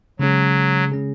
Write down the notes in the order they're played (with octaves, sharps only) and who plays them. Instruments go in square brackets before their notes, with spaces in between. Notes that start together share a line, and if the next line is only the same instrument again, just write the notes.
[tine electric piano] C#3 G#3 C#4 G#4 [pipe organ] F#3
[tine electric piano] C#3 G#3 C#4 G#4